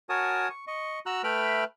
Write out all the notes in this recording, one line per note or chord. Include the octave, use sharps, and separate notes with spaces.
F#4 A#4 C#5 G#5 A5 D#6
C#6
D#5 C#6
F#4 A#5 E6 F#6
A3 B4 E5 G5 B5 F6